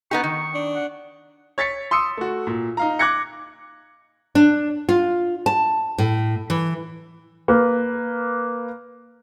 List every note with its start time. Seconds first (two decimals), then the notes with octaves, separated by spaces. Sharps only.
0.11 B3 D#4 G4 C#6
0.24 D#3
0.55 D4
0.75 F#5
1.58 C#5 A6 B6 C#7
1.91 C6 D#6 E6 C#7
2.17 A3 F#4
2.47 A#2
2.77 D#4 F5 A#5
2.99 D6 F#6 G#6 A#6 C#7
4.35 D4
4.89 F4
5.46 A5
5.98 A2
6.50 E3
7.48 A#3 B4